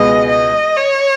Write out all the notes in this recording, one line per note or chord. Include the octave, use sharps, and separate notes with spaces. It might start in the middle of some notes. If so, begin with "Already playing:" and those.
Already playing: C#2 B2 G#3 B3 D#5
D#5
C#5